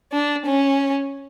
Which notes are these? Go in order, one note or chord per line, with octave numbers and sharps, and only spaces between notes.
D4
C#4